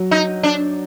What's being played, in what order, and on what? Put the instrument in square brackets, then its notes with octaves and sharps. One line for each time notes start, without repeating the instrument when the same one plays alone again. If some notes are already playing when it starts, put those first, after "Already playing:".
Already playing: [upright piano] F#3
[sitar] D#4
D4